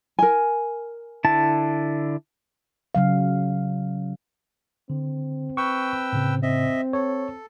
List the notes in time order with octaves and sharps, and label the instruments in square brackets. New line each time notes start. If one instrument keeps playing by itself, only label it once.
[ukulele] A#4 G#5
[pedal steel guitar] D3 E4 A5
[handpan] C#3 F#3 F5
[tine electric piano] D3 [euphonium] C4
[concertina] B4 G5 E6 [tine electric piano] C#6
[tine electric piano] A2 C#3
[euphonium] C4 [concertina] D#5 E5
[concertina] A4 [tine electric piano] C#5